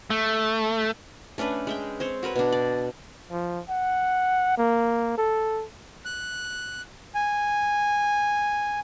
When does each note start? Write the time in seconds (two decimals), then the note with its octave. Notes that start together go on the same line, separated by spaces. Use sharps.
0.10 A3
1.38 A3 C#4 D4 B4
1.67 G#3 E5 G5
2.00 C4 C5 C#5
2.23 F#4 A#4 B4 C#5
2.36 B2 D4
2.52 D5
3.31 F3
3.69 F#5
4.58 A#3
5.18 A4
6.05 F#6
7.15 G#5